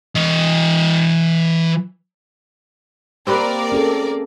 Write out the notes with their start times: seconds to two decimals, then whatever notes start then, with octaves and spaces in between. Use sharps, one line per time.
0.15 E3 D#5
3.27 A#3 C4 G4 A#4 B4 D5
3.72 C#4 G#4 A4